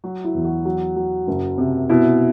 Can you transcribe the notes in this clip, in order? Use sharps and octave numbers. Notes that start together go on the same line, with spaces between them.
F#3 F#4
E4
E2
F#4
F#3
F#3
F#1
C3
B2 E4